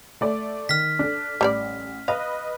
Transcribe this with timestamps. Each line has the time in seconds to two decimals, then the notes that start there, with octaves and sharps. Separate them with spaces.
0.21 A3 D5
0.69 D#3 F6 B6
0.99 D4 A4
1.41 A1 G3 C#5 D5
2.08 B4 D#5 F5